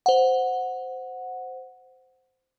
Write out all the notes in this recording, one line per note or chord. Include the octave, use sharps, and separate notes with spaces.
C5 F#5